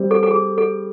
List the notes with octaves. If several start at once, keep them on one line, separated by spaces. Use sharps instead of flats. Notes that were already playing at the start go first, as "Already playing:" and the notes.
Already playing: G3 C4
A4
A4
G#4
A4